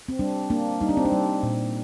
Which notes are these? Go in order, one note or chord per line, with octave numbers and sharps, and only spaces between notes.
C4
G3 D4
A#3 D4
G3 D#4
D4
C4
D4
G3
A#2